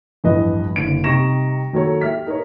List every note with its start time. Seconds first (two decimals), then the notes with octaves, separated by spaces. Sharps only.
0.24 A1 E2 G2 F3 B4 D#5
0.76 F#1 D3 D7
1.04 C3 G3 D#4 C#6 A#6 E7
1.73 D#3 F#3 A#3 A4 C#5
2.01 G4 E5 F6 B6
2.26 D#4 A#4 B4 C#5